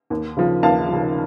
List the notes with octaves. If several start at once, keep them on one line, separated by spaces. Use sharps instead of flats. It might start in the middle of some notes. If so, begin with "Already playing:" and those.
D#2
C#3 F3
D#2 F5 A5
C#3 F3